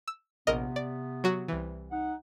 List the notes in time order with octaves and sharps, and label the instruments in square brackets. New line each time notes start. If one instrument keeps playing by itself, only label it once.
[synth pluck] E6
[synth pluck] A#1 A#4 D#5 [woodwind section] C3 B3
[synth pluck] D5
F#3 F#4
C2 E3
[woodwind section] D#4 F#5